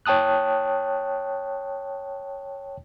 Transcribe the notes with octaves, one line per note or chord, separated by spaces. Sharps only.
C#5 G5 A5 D#6 F#6